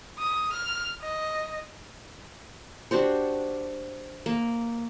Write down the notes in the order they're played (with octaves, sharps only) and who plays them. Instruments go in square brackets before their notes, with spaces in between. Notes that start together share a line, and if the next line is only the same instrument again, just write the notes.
[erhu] D#6
F6
D#5
[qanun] D4 F#4 G4 C5
A#3